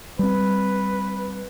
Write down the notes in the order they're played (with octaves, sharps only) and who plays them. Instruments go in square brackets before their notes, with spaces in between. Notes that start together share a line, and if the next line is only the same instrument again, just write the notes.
[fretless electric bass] G3 C4 [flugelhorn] B4